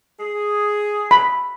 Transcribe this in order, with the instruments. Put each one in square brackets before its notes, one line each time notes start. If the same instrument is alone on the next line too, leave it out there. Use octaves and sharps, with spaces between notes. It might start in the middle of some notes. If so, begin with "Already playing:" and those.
[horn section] G#4
[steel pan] B5